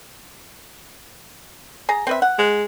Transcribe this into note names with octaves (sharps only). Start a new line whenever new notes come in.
G#4 A#5
C4 B4 E5
F#5
G#3